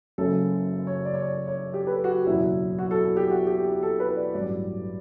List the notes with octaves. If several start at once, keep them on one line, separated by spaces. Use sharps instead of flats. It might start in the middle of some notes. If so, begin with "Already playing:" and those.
F#1 F#2 C#3 A4
C#5
D5
C#5
D5
C#5
G4
B4
A4
F#4
G4
F#1 E2 B2 F#3 E4
F#4
A4
A4
G4
F#4
G4
G4
A4
B4
D5
A1 G2 F#3 D5